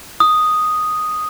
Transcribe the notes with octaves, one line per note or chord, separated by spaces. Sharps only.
D#6